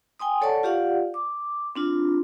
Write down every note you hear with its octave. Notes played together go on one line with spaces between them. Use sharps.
G5 G#5 C6 D#6
A4 C#5 D5 F#5 A5 C#6
F4 G4 D5 F5 F#5
D6
C4 D4 F4